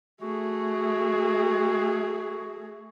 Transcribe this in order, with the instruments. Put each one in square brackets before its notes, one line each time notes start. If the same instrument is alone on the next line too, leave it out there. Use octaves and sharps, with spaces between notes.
[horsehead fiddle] A3 G#4 [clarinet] F#4